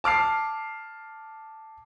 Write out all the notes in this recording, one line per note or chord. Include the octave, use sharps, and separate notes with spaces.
A5 D6 F6 C7